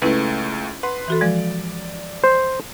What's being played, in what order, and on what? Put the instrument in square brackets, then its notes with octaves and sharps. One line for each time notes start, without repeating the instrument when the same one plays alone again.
[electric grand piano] C#2 A3 [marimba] C#4 E4 B4
[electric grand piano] B4 C6 [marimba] F#5
[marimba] E3 F#4 A4
[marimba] F3 G#3 [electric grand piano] D5
[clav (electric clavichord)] C5